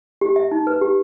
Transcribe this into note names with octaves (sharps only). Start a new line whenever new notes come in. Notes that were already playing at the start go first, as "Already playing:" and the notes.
G4
E5
D#4
B4
G4